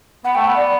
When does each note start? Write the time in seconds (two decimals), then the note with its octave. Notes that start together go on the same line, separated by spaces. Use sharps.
0.25 B3 F#5
0.35 A3 G5
0.46 B3 F#5
0.57 D5